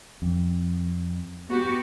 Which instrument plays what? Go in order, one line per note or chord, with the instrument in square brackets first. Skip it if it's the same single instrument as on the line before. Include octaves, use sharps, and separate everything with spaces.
[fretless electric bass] F2
[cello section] B3 F#4 G4